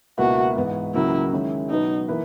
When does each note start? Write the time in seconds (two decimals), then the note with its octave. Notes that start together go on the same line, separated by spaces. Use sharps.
0.18 C#2 B2 A#3 E4 F#4 B4
0.56 G#2 E3 B3
0.94 C#2 C#3 F#3 A#3 E4
1.33 D#3 G#3 C#4 E4
1.70 B2 F#3 B3 D#4
2.08 E3 A#3 E4 B4